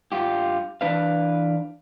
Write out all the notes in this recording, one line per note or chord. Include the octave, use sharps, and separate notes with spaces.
G2 F4 G4
E3 D4 B4 F5